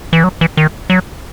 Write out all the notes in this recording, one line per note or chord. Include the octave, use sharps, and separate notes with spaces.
E3
F#3
E3
D#3
F#3